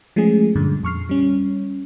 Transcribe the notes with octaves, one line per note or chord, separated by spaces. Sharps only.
F3 G#3 A3 C#4 G#4
G2 A#2 D3
F2 C#6 F6 C7
G3 C#4